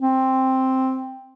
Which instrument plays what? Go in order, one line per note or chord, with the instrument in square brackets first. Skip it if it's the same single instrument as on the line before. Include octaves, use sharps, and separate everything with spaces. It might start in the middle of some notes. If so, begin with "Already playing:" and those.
[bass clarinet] C4